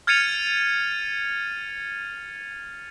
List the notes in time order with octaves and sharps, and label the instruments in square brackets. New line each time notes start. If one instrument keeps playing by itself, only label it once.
[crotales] F6 G#6 A6 C#7 D#7 F7